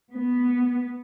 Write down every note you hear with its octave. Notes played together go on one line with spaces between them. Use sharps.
B3